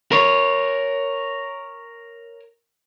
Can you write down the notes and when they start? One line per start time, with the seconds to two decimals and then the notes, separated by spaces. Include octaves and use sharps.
0.12 A#4 C#5